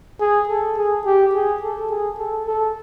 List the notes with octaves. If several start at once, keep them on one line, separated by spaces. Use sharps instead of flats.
G#4
A4
G#4
G4
G#4
A4
G#4
A4
A4